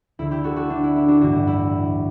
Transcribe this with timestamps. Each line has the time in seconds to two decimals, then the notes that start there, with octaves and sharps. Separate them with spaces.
0.19 D2 D3 E4
0.31 E4 G4
0.44 F#4 A4
0.56 F#4 A4
0.70 D4
0.83 E4
0.96 E4
1.08 D4 F#4
1.21 A1 G2 D3 D4 F#4
1.47 E4